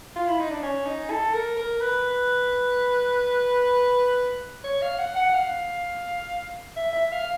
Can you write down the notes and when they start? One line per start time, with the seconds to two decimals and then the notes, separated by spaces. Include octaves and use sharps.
0.16 F4
0.27 E4
0.39 D#4
0.51 D4
0.62 C#4
0.86 D#4
1.10 A4
1.34 A#4
1.57 A#4
1.81 B4
4.64 C#5
4.82 F5
4.99 F#5
5.16 F#5
5.30 F#5
5.34 F5
6.77 E5
6.93 E5
7.12 F5